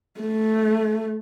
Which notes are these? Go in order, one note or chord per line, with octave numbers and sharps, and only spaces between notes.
A3